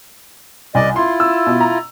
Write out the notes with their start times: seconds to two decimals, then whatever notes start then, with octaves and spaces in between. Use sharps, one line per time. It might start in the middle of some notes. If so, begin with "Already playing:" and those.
0.75 C2 D5 D#5 G#5
0.96 E4 F4 C6
1.20 E6
1.47 B2
1.61 A#5